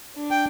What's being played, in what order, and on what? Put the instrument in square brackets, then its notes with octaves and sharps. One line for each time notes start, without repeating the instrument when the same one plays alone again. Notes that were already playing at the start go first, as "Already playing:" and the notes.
[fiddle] D4
[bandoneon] G5